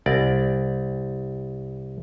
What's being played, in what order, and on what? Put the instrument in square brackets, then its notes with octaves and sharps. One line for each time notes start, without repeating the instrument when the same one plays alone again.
[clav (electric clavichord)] C2 D5